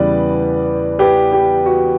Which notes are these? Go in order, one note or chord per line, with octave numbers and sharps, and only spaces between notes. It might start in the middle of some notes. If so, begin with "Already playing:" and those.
Already playing: E2 C#3 E3 G3 B4 D5
G4 B4
G4
F#4